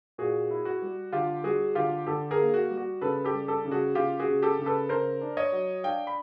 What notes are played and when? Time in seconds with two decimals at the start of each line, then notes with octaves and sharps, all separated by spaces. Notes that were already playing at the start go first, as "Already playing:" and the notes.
0.18 A#2 F#4 G#4
0.51 E4
0.65 F#4
0.82 G3
1.13 D3 F4 G4
1.44 G3 F#4 G#4
1.75 D3 F4 G4
2.07 D3 G4 A4
2.31 G#4 A#4
2.39 A#3
2.54 F#4
2.70 G3
2.77 F#4
3.01 C#3 A4 B4
3.24 G4 A4
3.33 G3
3.48 G4 A4
3.65 C#3
3.71 F#4 G#4
3.95 C#3 F4 G4
4.19 F#4 G#4
4.27 C#3
4.42 G4 A4
4.59 C#3
4.66 A4 B4
4.89 C#3 A#4 C5
5.21 D4
5.37 C#5 D#5
5.52 F#3
5.84 D4 F5 G5
6.07 B5